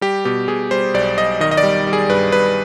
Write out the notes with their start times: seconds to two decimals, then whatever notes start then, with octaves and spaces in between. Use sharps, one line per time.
0.01 G3 G4
0.25 B2 G4
0.48 B2 G#4
0.71 G3 C5
0.94 B1 D5
1.18 B1 D#5
1.40 D#3 D#5
1.51 D#5
1.57 D5
1.63 G3
1.87 G3
1.93 G#4
2.09 G2 B4
2.32 G2 B4